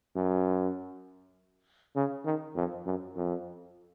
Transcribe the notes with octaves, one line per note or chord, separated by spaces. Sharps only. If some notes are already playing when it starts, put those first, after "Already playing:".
F#2
C#3
D#3
F2
F#2
F2